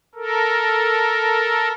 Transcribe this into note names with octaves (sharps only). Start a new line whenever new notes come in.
A4 A#4